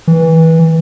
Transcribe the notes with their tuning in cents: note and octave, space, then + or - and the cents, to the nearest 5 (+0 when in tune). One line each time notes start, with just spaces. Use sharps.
E3 -20